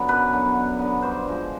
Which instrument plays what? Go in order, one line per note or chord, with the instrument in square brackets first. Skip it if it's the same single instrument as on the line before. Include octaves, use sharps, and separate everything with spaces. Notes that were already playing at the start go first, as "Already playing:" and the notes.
Already playing: [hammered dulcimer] D3 F#3 B3
F#2 B4
D3 F#3 B3
F#2
D3 F#3 B3
G2 C5
D3 F3 G#3